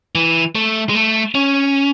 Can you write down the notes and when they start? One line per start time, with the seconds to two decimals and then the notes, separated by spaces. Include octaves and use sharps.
0.15 E3
0.55 A3
0.89 G#3
0.95 A3
1.35 C#4